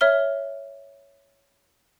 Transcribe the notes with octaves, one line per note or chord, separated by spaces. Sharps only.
C#5 E5 F6 G7